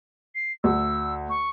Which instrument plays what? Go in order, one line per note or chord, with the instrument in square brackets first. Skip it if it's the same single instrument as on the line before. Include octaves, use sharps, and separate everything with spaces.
[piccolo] C7
[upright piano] D2 [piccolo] E6
[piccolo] C#6